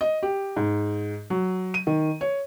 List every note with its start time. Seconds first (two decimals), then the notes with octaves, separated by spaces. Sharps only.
0.01 D#5
0.23 G4
0.57 G#2
1.30 F#3
1.74 D#7
1.87 D#3
2.21 C#5